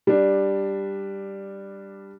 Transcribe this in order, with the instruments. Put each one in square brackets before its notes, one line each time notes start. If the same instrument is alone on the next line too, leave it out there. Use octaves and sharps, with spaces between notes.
[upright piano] G3 D4